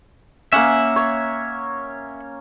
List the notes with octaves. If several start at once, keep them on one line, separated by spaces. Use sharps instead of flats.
A#3 C#4 E5 F#5
C#5